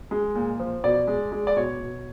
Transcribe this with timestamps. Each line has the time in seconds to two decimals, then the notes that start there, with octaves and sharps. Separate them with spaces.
0.11 G#3
0.35 A#2
0.60 F3
0.84 B2 D5
1.07 G#3
1.32 G#3
1.47 D5
1.56 B2 C#5
1.80 B2